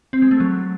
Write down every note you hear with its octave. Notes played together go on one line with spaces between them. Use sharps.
C4
G#3
A3
F#3